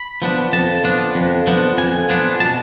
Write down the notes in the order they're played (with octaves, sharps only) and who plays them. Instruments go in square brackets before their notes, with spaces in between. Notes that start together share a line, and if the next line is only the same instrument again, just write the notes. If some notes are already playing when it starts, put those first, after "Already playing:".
Already playing: [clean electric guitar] B5
F3 B3 D4
F2 A5
F3 B3 D4
F2
F3 B3 D4
F2 G#5
F3 B3 D4
B2 A5